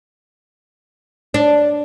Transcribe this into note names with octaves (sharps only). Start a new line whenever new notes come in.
D4